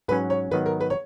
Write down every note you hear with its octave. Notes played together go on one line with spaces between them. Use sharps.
G#2 F#3 C#4 B4
C#5
G#2 D#3 F#3 B3 B4
A#4
B4
C#5